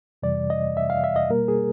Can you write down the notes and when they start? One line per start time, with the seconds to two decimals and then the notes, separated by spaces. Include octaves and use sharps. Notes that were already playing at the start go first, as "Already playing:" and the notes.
0.23 F2 C3 E3 G3 D5
0.50 D#5
0.77 E5
0.90 F5
1.04 E5
1.16 D#5
1.29 B2 G3 A#3 A#4
1.48 G#4